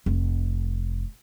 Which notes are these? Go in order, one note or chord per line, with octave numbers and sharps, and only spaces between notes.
F1